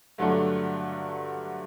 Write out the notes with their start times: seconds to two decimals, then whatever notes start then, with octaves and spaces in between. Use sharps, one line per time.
0.18 G2 D3 F#3 A3 D4